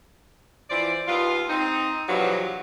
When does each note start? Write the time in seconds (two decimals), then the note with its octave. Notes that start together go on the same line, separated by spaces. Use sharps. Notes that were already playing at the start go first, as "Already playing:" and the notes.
0.69 E3 F3 C5 D5
1.07 D#2 B3 F4
1.49 C4 D#4
2.08 E2 G2 B2 F3 F#3